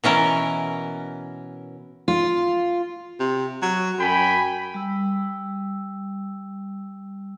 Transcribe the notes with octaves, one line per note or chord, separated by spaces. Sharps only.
B2 E3 C#4 A#4
F4
C3
F#3
F#2 G5 G#5 B5
G3 E6